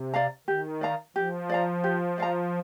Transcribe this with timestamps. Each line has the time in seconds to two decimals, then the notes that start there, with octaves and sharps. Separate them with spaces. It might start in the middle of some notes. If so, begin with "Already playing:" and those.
Already playing: C3
0.14 D5 F5 A#5
0.47 D#3 G4
0.81 D5 F5 A#5
1.16 F3 G4
1.49 D5 F5 A#5
1.84 G4
2.18 D5 F5 A#5